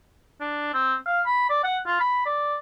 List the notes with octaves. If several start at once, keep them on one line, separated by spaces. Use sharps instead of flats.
D4
C4
F5
B5
D5
F#5
F4
B5
D5